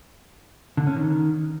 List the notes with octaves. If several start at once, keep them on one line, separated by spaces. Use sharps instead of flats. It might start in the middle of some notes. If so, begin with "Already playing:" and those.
D3
C#4
D#3